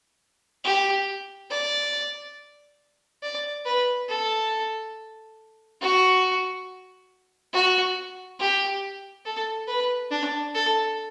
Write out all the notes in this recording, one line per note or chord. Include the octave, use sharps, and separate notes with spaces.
G4
D5
D5
B4
A4
F#4
F#4
G4
A4
B4
D4
A4